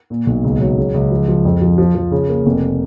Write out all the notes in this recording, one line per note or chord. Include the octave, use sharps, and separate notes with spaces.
A#2
B1
C#2
F#3
C#3
C#2
F3
F3
F2
F3
F3
F3
C#3
A#3
F1